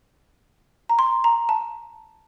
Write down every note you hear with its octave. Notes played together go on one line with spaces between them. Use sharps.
A#5
C6
A#5
A5